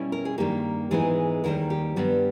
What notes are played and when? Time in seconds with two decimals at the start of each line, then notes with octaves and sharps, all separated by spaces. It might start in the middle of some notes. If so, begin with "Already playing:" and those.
Already playing: B2 G3 C#4 E4
0.12 A#4
0.25 G#4
0.38 G2 D#3 G3 A#3 G4
0.91 G#2 E3 G#3 B3 D#4 G#4
1.44 D#2 D#3 G3 A#3 A#4
1.70 G4
1.96 G2 G3 B3